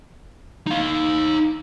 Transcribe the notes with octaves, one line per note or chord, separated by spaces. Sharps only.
D#4 F5